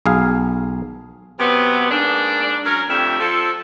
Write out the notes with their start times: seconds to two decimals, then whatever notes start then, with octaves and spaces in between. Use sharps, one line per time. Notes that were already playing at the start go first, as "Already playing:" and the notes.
0.06 B1 G#4 F5
1.40 C3 F#3 B3
1.90 G#2 A#3 D4
2.65 F#3 C#4 A#4
2.89 F2 D3 A3 G4 E5
3.19 F3 A4